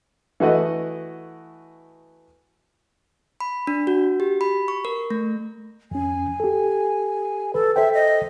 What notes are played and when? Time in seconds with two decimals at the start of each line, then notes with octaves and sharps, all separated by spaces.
0.40 E3 A3 F#4 D#5
3.40 B5
3.67 D4
3.87 F#4
4.20 G4
4.41 B5
4.68 C#6
4.85 A#4
5.10 A3
5.91 F2 C#4 G#5
6.40 G4 A4
7.54 A4 B4
7.76 A4 C5 E5 G5
7.94 D#5